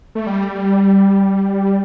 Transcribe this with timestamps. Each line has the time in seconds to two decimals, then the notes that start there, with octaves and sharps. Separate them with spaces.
0.15 A3
0.27 G3